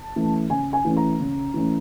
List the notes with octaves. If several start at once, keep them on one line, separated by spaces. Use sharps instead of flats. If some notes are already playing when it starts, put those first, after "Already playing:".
Already playing: A5
E3 A3 C#4
C#3 G#5
G#5
E3 A3 C#4
A#5
C#3
E3 A3 C#4